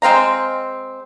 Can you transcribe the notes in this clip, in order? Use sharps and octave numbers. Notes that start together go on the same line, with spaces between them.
G#3 C4 F5 A#5